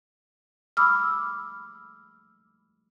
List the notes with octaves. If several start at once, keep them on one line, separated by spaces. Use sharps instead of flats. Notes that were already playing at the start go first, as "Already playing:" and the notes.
B5 D6 E6 F6